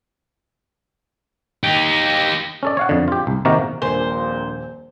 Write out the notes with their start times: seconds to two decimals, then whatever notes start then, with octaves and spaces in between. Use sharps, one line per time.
1.63 D#4 G4
2.63 C#4 A4 D5
2.77 C#5 F5 F#5
2.89 F2 D3
3.08 F4 G4
3.27 C2
3.45 C3 D#3 A#3 F#4 G4 A#4
3.82 D#1 A#1 F2 A#2 C5 G#5